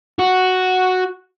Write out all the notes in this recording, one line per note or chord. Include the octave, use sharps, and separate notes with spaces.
F#4